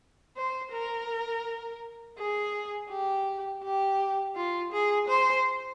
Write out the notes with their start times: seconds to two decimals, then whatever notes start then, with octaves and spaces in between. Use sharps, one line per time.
0.37 C5
0.73 A#4
2.18 G#4
2.91 G4
3.63 G4
4.36 F4
4.72 G#4
5.08 C5